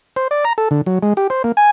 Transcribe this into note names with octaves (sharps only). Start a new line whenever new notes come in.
C5
D5
A#5
A4
D3
F#3
G#3
G4
C5
A#3
G#5